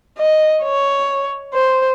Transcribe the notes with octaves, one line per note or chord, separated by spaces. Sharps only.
D#5
C#5
C5